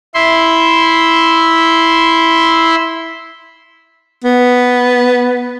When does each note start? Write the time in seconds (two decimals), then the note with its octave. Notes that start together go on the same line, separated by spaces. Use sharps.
0.14 E4 E5 C6
4.24 B3